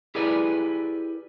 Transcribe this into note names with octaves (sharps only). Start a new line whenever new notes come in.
E4 G4 G#4 A#4 B4 D5